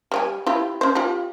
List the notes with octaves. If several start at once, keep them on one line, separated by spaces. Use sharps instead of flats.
G3 C#5 G#5
E4 F4 G4
C#4 C5
F4 G4